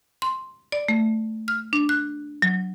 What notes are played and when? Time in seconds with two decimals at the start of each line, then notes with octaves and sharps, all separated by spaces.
0.22 C6
0.72 D5
0.88 A3
1.48 F6
1.73 D4
1.89 F#6
2.42 F#3